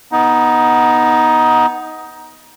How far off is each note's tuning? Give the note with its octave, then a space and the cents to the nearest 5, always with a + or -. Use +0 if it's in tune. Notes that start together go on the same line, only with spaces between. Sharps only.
B3 +0 D#4 +10